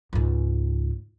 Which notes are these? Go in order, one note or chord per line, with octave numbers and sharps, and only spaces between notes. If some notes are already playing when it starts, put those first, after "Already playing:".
C#2 G#2